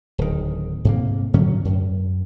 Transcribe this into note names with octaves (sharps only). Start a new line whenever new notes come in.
D1 D#3
G#2 C3 A#3
G#2 D3 F#3 C#4
F#2